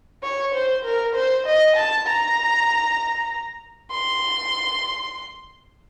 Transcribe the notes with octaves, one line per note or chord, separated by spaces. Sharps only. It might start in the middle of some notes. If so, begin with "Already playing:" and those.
C#5
C5
A#4
C5
D#5
A5
A#5
C6